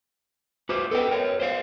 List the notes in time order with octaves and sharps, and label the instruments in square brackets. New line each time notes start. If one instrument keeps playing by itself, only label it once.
[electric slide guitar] F#4 B4 C5 [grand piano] D6
[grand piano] B3 [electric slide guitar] A4 D#5 G5
[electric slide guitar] A#4 C#5
C5 D5 F5